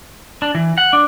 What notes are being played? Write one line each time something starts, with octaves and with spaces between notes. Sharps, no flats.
D4
E3
F#5
D4